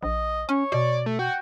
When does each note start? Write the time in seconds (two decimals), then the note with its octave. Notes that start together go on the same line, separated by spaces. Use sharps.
0.03 A#1 D#5
0.49 C#4 C#5
0.72 B2 D5
1.06 A3
1.19 F#4 G5